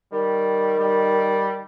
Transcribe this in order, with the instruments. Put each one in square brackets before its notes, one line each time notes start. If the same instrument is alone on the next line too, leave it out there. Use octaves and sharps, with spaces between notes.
[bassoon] D#3 [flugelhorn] G3
[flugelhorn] G3